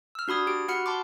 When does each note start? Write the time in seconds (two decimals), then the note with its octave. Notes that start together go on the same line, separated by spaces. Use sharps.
0.15 E6 F6
0.28 D4 F#4 B5 D#6 G#6
0.47 G4 D7
0.68 F#4 F#5 B5 F6 C#7
0.86 A5 C6 D6